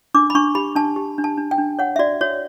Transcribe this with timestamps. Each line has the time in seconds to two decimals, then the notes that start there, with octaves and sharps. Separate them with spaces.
0.14 D4 D6
0.30 B5
0.35 D4 C#6
0.55 G4 B5
0.76 D4 A5
0.96 G4
1.18 D4
1.24 A5
1.38 D4
1.51 G5
1.58 D4
1.79 C#5 F#5
1.96 E5
1.99 F#4 D5
2.21 F#4 C#5